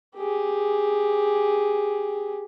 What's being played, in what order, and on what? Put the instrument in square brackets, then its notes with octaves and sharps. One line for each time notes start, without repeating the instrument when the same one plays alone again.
[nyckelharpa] G4 G#4